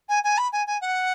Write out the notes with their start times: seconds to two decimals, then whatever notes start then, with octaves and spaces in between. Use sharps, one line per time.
0.09 G#5
0.24 G#5
0.38 B5
0.53 G#5
0.67 G#5
0.81 F#5